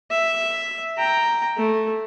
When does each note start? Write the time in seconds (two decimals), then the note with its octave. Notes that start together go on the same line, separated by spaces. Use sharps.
0.11 E5
0.97 G5 A#5
1.58 A3